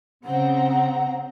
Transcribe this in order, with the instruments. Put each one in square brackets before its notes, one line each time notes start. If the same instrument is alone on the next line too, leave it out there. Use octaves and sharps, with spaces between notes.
[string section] C#3 C4 A#5 [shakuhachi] F#5